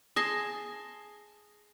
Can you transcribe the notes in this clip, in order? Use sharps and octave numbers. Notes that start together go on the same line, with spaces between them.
G#4 A5 C6 D#6 A#6